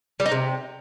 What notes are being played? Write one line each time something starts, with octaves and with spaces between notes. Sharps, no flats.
G3
D#4
C3